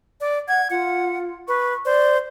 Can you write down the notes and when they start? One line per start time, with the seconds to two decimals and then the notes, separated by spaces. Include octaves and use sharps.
0.21 D5
0.48 F#5 G#6
0.70 F4 F#5
1.48 B4 C#6
1.85 C5 D5